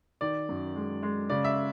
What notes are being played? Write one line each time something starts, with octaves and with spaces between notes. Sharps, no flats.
D#3 D5
F#2
G#3
G#3
C#3 D5
E5